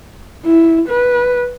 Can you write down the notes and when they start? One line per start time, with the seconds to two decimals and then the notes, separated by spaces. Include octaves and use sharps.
0.45 E4
0.89 B4